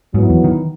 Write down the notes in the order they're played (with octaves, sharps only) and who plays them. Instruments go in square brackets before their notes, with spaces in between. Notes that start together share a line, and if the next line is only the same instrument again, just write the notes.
[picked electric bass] G#2 [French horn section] F#3 B3 E4
[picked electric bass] E2
D#3